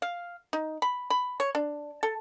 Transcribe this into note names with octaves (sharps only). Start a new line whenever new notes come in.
F5
D#4
B5
B5
C#5
D4
A4